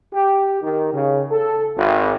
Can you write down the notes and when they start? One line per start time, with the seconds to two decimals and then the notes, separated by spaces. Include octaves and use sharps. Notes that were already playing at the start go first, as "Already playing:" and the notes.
0.13 G4
0.62 D#3
0.92 C#3
1.31 A4
1.77 G#1